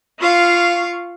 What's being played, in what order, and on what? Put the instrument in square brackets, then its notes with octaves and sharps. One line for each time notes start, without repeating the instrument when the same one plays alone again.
[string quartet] F4 F5 C#6